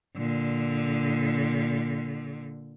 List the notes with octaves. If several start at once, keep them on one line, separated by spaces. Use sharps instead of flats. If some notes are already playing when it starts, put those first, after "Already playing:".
A#2 D3